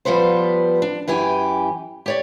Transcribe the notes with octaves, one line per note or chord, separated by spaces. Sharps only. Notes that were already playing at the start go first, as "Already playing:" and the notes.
F3 G3 B3 B4 C5
D4
F#2 E3 G4 G#5
G4 C#5 D5